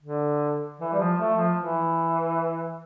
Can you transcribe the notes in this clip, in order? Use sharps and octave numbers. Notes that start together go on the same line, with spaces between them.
D3
E3
G3
F3
A3
F3
E3